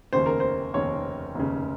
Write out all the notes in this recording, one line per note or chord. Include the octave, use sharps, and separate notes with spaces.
F1 D#2 C#3 C5
A#4
C5
F1 D#2 C#3 C#5
F1 D#2 C#3